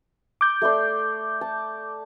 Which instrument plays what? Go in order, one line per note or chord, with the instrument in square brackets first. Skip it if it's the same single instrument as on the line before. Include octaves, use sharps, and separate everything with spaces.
[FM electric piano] D6 G6
[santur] A3 D5 C6
A5